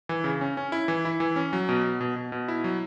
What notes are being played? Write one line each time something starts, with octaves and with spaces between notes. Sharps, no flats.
E3
C#3
C#4
C#4
E4
E3
E4
E3
C#4
F#3
B2
B2
B2
B2
B2
E4
F#3